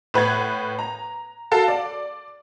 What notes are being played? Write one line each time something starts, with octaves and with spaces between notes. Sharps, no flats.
A2 B4 F#5 G#6
A#5
F#4 A4 F5
D5